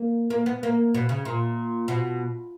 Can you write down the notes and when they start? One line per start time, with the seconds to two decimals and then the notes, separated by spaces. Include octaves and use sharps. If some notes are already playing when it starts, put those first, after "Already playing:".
Already playing: A#3
0.30 A#3
0.46 B3
0.63 A#3
0.94 B2
1.09 C#3
1.25 A#2
1.88 B2